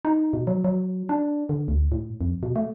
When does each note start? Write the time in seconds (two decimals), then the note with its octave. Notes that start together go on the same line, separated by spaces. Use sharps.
0.05 D#4
0.33 B2
0.47 F#3
0.64 F#3
1.09 D4
1.49 D3
1.68 D2
1.92 A2
2.21 F2
2.43 B2
2.56 A3